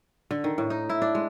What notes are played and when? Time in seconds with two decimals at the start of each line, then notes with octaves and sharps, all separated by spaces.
0.31 D3
0.44 D#3
0.58 A2
0.70 D#4
0.89 E4
1.02 D4
1.15 G#3